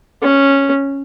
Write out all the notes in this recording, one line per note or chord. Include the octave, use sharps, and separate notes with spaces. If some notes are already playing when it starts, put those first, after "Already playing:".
C#4